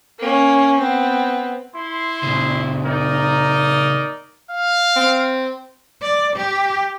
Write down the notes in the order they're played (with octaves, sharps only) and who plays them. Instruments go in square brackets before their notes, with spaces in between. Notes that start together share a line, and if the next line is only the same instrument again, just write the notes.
[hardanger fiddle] A#3 C#4
B3 C4
[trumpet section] E4 C6
[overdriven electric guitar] A#2 C#3
[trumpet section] D#4 A#4 D5
[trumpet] F5
[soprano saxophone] C4
[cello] D5
G4